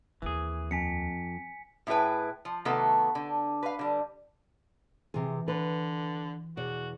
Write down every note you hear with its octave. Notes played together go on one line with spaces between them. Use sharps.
D#2 E3 C4 G#4
F2 G#5 B6 C#7
A2 E4 G#4 B4 G5
F3
C3 D#3 F#3 A3 B3 A4
D3
B4 F5
D3 G3
C3 E3 F4 G#4
D3 B4
E1 F#4 D5